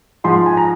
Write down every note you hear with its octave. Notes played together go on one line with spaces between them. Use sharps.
G#2 F3 C6
C6
G#5
A#5